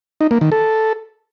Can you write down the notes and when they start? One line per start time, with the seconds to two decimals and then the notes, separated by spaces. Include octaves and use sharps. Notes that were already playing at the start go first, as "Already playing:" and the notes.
0.21 D#4
0.31 A#3
0.41 D#3
0.52 A4